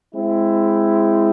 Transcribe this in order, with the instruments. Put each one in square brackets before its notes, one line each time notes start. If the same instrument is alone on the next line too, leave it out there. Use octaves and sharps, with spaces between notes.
[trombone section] G#3 C4 E4